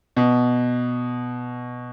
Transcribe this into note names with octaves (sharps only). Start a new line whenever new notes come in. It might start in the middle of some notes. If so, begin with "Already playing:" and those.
B2